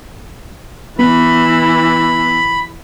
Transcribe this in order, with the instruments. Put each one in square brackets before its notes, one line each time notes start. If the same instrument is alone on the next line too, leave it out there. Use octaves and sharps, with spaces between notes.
[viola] E3 [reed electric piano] B3 [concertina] B5